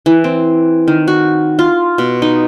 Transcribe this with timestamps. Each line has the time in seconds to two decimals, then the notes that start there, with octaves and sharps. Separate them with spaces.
0.06 E3
0.24 C4
0.88 D#3
1.08 F#4
1.59 F4
1.98 B2
2.22 D#4